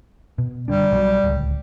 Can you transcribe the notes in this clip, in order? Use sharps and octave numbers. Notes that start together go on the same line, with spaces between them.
B2
F#1 D3 G3 D4
B1 F3 F#3
D1 C#2